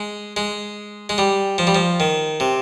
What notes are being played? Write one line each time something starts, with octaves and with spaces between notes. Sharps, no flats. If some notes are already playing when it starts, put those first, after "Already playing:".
Already playing: G#3
G#3
G#3
G3
F3
G3
F3
D#3
C3